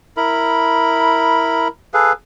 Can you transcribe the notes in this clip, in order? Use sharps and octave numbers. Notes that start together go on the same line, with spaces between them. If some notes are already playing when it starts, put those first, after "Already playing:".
E4 A#4 B5
G#4 A4 B4 F5